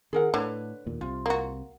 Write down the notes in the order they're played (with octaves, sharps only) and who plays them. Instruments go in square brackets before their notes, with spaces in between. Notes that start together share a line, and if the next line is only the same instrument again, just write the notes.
[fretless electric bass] D#3 [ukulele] G#4 A#4 F#5
[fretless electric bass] A2 [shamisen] D3 [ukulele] B4 C#5
[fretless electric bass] D#2 A#2
[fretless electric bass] C2 C3 [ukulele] F4
[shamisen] A#3 F#4